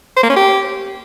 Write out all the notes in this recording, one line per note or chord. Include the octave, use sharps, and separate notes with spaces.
C5
A#3
C#4
G4